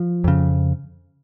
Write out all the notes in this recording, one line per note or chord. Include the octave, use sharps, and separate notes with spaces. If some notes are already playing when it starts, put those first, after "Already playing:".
Already playing: F3
F2 C#3